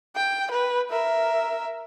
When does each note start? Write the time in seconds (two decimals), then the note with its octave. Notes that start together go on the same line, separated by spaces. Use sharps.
0.16 G5
0.51 B4
0.91 A#4 E5